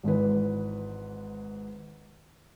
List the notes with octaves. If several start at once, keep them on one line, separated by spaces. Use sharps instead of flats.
G#1 G#2 E3 B4